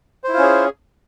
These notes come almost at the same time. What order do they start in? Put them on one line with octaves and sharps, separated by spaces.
C5 E4 F4 C#4 G#4